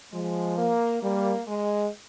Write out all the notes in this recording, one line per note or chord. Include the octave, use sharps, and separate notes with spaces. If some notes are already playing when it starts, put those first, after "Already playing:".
F3 G#3
A#3
G3 A#3
G#3